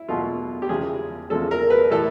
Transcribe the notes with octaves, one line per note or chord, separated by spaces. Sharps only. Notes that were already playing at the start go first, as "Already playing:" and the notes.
Already playing: E4
E2 B2 F#3 A3 F4
G4
E2 C#3 F3 G#3 G#4
E2 C#3 F3 G#3 A4
A#4
B4
A2 E3 A3 A4